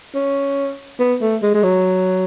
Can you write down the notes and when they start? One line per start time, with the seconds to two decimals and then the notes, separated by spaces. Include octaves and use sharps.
0.15 C#4
1.00 B3
1.21 A3
1.42 G#3
1.54 G#3
1.63 F#3